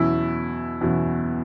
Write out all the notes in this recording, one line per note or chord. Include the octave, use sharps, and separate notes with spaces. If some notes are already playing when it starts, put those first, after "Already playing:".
Already playing: E2 B2 F#3 C#4 E4 F#4
E2 B2 F#3 C#4 F#4